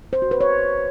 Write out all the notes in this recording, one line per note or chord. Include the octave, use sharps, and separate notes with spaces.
C5
F#4
B4
C#5